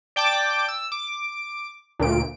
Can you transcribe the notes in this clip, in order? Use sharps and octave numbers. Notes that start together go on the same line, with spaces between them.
D5 G5 A5 D6
E6
D6
D2 A#2 D7